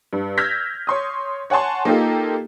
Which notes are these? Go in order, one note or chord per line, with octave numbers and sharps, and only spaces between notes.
G2
E6 F6 G6 G#6 A#6 B6
C#5 C6 D#6
C#5 F#5 G#5 A5 C6
A#3 D#4 F4 G4 A4